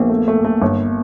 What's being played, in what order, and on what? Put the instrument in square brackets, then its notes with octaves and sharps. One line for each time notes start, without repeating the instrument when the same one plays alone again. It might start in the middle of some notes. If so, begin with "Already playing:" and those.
Already playing: [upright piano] A#1 [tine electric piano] A#3 B3
[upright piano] A3
A3
A3
G1